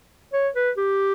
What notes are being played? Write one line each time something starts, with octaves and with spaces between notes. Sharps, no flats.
C#5
B4
G4